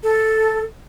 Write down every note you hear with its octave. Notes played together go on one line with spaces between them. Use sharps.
A4